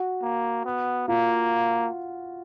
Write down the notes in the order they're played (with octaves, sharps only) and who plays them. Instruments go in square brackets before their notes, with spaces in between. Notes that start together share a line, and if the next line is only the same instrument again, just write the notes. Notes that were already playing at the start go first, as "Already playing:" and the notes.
Already playing: [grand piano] F#4
[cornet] A#3
B3
[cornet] A#3 [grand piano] F4